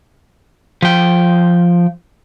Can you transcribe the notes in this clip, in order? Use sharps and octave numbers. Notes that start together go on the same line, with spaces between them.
F3 G5